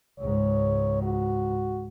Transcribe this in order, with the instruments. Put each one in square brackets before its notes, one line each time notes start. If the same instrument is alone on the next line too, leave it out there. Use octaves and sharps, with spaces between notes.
[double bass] C#2 G#2 [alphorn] C#5
[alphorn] F#4